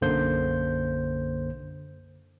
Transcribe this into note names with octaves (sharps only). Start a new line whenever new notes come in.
B1 F#2 D3 A#3 C5 G6